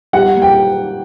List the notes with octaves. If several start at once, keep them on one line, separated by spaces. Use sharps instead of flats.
G3 F#5
A#3
G5